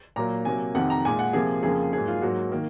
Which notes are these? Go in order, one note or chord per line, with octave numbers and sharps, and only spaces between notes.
A#2 F#3 A#3 A#5
C3 F#3 A#3 G#5
F2 C3 D#3 F#5
A#5
A#2 G#3 G#5
F#5
C3 F3 A#3 G#4
F2 C#3 F3 A#3 G#4
G#2 F#3 A#3 G#4
F4
G#2 F#3 A#3 F#4
D#3 A#3